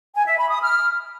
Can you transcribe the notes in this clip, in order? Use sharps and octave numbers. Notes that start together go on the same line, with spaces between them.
G#5
E5
B5
D#6
F6